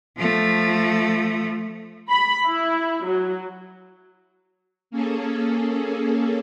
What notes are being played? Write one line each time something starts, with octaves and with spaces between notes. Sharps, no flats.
F3 A3
B5
E4
F#3
A#3 C#4 G#4 A4